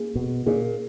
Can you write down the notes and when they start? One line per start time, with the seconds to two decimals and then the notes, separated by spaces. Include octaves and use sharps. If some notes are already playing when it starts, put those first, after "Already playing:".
Already playing: A#3 D#4 G#4
0.15 B2
0.46 A#2 A#3 D#4 G#4 C#5